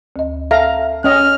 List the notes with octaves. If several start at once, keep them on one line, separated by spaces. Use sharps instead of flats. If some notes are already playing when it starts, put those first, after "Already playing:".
D2 D#5
A4 E5 F5 A#5
C#4 D#5 F6